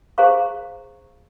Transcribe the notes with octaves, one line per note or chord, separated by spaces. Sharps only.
G#4 C5 F5 A#5 C#6